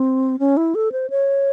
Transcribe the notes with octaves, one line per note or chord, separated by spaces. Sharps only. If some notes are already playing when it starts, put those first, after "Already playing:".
Already playing: C4
C#4
E4
A4
C5
C#5